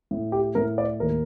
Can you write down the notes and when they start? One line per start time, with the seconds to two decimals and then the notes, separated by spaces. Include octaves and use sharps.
0.11 A2
0.32 G4
0.55 A2 A#4
0.78 D5
1.00 D#2 A#4